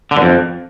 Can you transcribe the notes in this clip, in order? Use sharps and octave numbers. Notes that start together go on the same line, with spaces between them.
D3
G2
F2